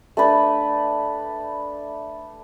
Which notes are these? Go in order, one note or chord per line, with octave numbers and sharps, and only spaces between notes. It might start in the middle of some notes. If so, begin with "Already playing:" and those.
A3 D4 B4